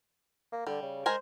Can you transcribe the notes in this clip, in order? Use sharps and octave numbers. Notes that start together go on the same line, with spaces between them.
A#3
D3 G3
C#3
G#3 A#4 C5 G#5